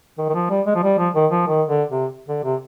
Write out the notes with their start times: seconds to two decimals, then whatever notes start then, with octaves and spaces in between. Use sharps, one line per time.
0.18 D#3
0.29 D#3
0.34 F3
0.50 G3
0.66 G#3
0.75 F3
0.83 G3
0.98 F3
1.15 D#3
1.31 F3
1.47 D#3
1.68 D3
1.90 C3
2.28 D3
2.44 C3